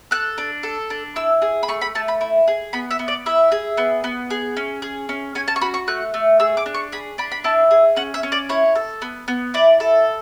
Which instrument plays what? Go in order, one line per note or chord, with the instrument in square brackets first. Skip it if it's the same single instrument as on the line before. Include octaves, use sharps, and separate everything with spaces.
[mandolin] A4 F#6
D4
A4
D4
E4 E6
G#4
B5
A3 C#6
B5
A3 A5
B5
E4
G#4
B3 B5
E5
B3
D5
E4 E5
G#4
B3
B3
G#4
C#4
G#4
C#4
C#4 G#5
A5
C#6
F#4 B5
C#6
A3 F#6
A3
G#4 E6
D6
D4
C#6
G#4 B5
D4 B5
B5
E4 A5
G#4
C#4 F#5
E5
C#4
D5
E4 C#5
A4
B3
B3
E4 D5
A4